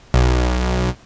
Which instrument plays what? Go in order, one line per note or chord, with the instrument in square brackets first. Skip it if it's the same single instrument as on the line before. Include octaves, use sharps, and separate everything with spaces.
[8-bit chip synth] B1